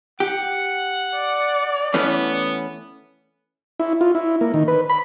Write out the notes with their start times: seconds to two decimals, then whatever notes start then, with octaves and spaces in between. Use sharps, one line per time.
0.20 G4 F#5
1.15 D5
1.94 E3 A3 B3 C#4
3.80 E4
4.01 F4
4.15 E4
4.41 A#3
4.54 D#3
4.68 B4
4.89 B5